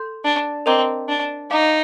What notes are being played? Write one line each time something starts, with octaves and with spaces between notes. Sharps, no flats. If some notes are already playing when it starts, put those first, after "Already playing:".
Already playing: A4 C6 G6
D4
C4 A#4 D#5 A#5 D6 G6
D4
D#4 F5 A#5 D6